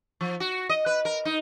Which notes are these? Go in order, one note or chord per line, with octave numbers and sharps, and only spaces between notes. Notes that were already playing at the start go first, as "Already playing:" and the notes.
F3
F#4
D#5
B4
A#4
D#4